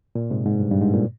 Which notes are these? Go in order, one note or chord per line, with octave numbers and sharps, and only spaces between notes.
A#2
G#2 C3
G#2
G2
G2
G#2
A#2